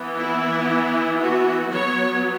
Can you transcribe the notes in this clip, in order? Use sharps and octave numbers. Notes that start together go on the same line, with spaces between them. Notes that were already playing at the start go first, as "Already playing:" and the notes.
Already playing: E3 B3
E4
F#4
F#3 B3 C#5